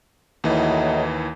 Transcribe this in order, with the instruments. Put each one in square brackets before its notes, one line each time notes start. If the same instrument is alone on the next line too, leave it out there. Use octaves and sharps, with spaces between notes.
[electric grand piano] D#2 E3 [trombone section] A2 F#3 D#4